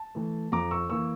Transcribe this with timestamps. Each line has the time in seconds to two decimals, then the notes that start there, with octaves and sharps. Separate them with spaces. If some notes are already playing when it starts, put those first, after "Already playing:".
Already playing: A5
0.15 E3 A3
0.52 F2 A#5 D6
0.71 C#6 E6
0.89 E3 A#3 C#6 E6